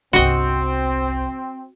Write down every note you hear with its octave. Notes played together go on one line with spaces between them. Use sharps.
G1 C2 C4 F#4 D#5